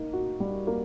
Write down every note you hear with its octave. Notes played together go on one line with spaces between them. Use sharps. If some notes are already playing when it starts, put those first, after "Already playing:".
Already playing: A#3 D#4
F#4
G3
A#3